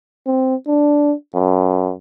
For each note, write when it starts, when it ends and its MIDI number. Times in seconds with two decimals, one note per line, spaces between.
0.26 0.55 60
0.67 1.13 62
1.35 1.93 42